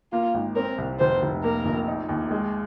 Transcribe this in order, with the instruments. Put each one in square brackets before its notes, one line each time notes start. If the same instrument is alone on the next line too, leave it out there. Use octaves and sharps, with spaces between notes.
[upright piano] A#3 [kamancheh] F4
[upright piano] G#1
[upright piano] C4 [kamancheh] A#4
[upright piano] C2
[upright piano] F1 [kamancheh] C5
[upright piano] F1
[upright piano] A#3 [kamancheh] A#4
[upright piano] A#1
D#4
D#2
G#3